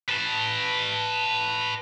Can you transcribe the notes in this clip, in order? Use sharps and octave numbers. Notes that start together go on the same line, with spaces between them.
B4 A5